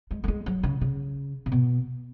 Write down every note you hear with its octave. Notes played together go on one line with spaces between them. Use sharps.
G#3
A3
G#3
F#3
C#3
C#3
C3
B2